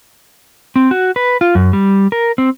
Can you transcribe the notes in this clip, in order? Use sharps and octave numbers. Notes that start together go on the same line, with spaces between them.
C4
F#4
B4
F4
F#2
G3
A#4
C4